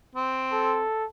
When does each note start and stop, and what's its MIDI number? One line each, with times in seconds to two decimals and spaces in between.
0.15 0.83 60
0.52 1.05 69